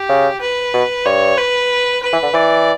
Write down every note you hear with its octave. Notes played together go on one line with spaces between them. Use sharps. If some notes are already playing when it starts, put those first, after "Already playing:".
Already playing: G4
C#3
B4
B2
G2 C#5
B4
B4
E3
D3
E3 D5